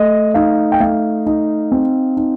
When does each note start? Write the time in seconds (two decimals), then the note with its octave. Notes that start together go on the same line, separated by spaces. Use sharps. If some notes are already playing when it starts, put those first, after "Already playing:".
Already playing: A3 D#5
0.34 D#4 F5
0.72 G5
0.80 A3 F5
1.26 D#4
1.72 C4
2.17 D#4